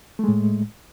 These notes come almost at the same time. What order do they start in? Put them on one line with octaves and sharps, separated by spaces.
A3 G#3 A2